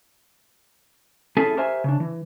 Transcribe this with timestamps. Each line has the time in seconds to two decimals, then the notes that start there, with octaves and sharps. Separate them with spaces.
1.37 C#4 E4 G#4 A4 E5 G#5
1.57 G4 A#4 C5 E5 G#5
1.84 C#3 D4
2.00 E3